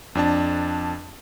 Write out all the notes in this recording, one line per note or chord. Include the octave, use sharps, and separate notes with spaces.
F2 D4 A5